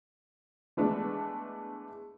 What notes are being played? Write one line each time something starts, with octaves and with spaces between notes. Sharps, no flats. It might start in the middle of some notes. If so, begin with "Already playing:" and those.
E3 G#3 A3 B3 D4